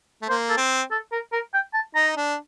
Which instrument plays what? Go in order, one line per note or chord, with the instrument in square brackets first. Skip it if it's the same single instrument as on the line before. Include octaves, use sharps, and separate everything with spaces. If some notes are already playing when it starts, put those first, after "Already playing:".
[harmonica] A3
[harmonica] A#3 [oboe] C5
[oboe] A4
[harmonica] C4
[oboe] A4
A#4
A#4
G5
A5
[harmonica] D#4 [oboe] A#5
[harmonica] D4